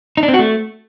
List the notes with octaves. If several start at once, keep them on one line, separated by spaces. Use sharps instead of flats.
D#4
D4
C4
F#4
A3